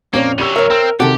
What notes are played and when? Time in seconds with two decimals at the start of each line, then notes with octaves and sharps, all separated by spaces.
0.13 F2 A#2 A#3 C4 C#4 C#5
0.38 D2 F#3 G4 E6 D#7
0.56 A#4 C#5 E5
0.70 C4 E6
1.00 C3 D#3 F#4 G4 A4